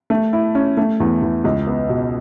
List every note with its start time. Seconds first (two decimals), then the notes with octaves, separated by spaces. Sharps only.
0.10 A3
0.33 E4
0.55 C#4
0.77 A3
1.00 E2
1.22 E2
1.44 C#2
1.67 B3
1.89 B2